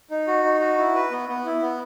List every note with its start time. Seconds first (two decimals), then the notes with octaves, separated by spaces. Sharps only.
0.11 D#4
0.27 F#4
0.44 D#4
0.60 F#4
0.78 E4
0.95 B4
1.11 B3
1.29 B3
1.45 E4
1.62 B3